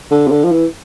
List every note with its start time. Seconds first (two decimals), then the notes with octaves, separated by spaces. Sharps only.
0.11 D3
0.27 C3
0.31 D3
0.44 F3
0.52 E3